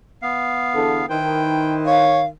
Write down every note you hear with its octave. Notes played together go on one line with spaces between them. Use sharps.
B3 F5
E2 D3 A4
D#3 E4 B4 C5 G5
C#5 F5